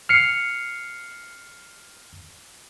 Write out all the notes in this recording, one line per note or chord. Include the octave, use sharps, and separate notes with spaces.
F6 C7 C#7